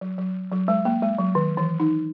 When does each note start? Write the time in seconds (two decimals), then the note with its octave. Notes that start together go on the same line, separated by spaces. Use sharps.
0.01 F#3
0.18 F#3
0.52 F#3
0.68 G#3
0.85 A#3
1.02 G#3
1.19 F#3
1.35 D#3
1.57 E3
1.80 D#4